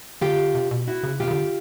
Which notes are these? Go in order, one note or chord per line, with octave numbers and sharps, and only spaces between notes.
D3 F4 G4
C3
B2
E4 F#4
C#3
C3 F4 G4
C#3
D3